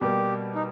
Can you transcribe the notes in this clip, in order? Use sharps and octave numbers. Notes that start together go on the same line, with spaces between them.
B2 G3 A#3 G4
D#4